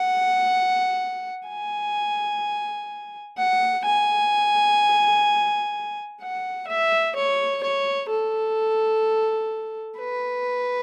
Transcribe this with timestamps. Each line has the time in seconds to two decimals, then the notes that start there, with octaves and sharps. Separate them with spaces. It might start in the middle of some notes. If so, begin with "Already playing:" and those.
Already playing: F#5
1.49 G#5
3.37 F#5
3.85 G#5
6.21 F#5
6.68 E5
7.16 C#5
7.63 C#5
8.10 A4
9.99 B4